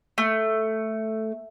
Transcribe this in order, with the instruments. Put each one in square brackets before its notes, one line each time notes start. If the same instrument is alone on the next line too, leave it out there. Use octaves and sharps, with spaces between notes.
[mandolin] A3